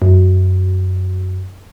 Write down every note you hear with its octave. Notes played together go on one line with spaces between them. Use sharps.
F#2